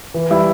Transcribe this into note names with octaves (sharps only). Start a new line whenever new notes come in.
E3
G3 E4